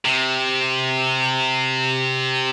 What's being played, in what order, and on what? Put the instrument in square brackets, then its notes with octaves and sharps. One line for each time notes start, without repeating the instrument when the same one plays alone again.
[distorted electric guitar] C3